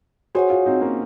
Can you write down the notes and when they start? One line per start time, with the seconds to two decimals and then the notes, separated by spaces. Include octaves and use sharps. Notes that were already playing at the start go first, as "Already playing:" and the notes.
0.35 F#4 G#4 C5 C#5 F#5
0.50 F4 G#4
0.65 C4 D#4
0.81 A#3 C#4